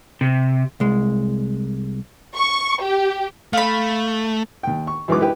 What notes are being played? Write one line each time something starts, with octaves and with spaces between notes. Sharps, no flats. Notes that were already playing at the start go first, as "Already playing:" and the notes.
C3
C2 G#3
C#6
G4
A3 F5 B5
D#2 G5
C#6
F#2 E3 G#3 D#4 B4 D6
E4 G4 B4 G5